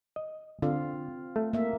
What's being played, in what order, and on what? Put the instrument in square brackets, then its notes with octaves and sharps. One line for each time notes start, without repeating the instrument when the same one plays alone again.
[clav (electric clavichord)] D#5
[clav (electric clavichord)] D3 [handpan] C4 F4 F5
[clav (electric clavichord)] A3
[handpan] A#3 E5